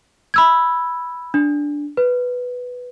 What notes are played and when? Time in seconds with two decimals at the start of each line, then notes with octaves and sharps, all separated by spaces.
0.34 B5 E6 G#6
1.34 D4
1.97 B4